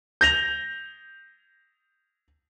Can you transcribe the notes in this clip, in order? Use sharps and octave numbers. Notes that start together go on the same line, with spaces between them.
G6 A#6 F7